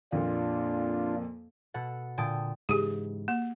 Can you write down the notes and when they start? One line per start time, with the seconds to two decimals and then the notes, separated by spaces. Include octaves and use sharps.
0.12 F2 A#2 D4 F4
1.74 B2 A4 F#5
2.18 A#2 D3 G5 A5 D#6 D7
2.69 G#2 C#3 E3 G4 G#4
3.28 A#3